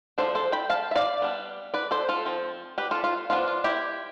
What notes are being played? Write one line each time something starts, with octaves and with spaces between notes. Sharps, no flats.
F3 B3 D4 A4 C5
A4 C5
G5 B5
F5 A5
E5
D5 F5
G3 B3 D4
B4 D5
A4 C5
F4 A4
F3 C4
G4 B4
F4 A4
F4
F3 B3 D4 F4
F4
E4 G4